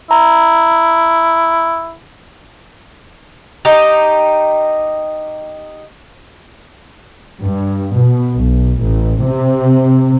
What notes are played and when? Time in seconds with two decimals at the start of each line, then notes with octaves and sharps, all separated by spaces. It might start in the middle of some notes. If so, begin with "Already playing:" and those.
0.11 E4 A#5
3.65 D#4 G4
7.42 G2
7.95 B2
8.36 B1
8.82 A1
9.24 C3